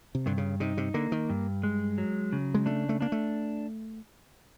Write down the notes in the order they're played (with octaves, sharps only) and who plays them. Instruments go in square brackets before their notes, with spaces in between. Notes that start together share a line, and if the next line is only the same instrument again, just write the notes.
[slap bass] C3
[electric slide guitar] G2 [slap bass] D3
[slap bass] C#3
[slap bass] C3 [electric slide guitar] D#4
[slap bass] C3
[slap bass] D3 [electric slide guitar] A#3
[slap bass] D#3
[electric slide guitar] G2
G#3
F#3
C#3
[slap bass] G#3
[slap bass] A3 [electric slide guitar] D4
[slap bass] A3
[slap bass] A#3 [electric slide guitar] D4
[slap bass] A3